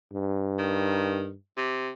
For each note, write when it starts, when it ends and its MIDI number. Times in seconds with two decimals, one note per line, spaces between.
0.13 1.36 43
0.59 1.28 51
1.57 1.90 48